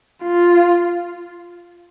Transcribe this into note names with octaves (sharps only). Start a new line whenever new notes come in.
F4